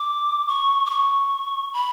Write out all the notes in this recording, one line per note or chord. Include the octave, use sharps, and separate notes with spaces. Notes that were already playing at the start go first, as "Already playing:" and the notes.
Already playing: D6
C#6
D6
C#6
B5